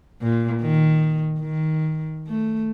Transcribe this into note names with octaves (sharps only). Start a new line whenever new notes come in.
A#2
D#3
D#3
A3